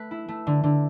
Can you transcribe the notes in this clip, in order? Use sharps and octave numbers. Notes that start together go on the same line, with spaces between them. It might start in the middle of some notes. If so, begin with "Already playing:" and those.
Already playing: A3 B4
E4
A3
D3
D3